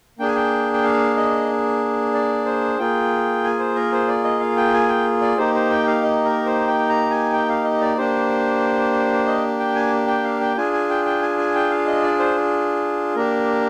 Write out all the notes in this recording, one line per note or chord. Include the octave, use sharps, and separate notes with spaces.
A#3 D4 G#4 G5
G#5
G5
G5
F5
D#5
D5
C5
A#3 F4 G#4 G5
G#5
C5
A#4
C5
D5
D#5
F5
G5
G#5
G5
D5
A#3 D#4 G4 C5
C5
G5
F5
D#5
A#4
C5
G5
A#5
G#5
G5
F5
D#5
D5
A#3 D4 G4 C5
D#5
G5
G#5
G5
F5
G5
D4 F4 G#4 G#5
G#5
G5
G5
G#5
G#5
G5
F5
D#5
D5
C5
A#3 D4 G4 A#4